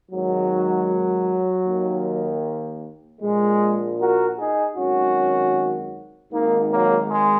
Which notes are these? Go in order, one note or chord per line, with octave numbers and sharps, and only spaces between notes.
G#1 G#2 D#3 F#3
D#2 D#3
A#1 A#2 G#3
F#4 A#4
D#4 G#4
G#1 F#2 D#3 C#4 F#4
G#1 G#2 D#3 A#3 D#4
F#3 A#3
G#3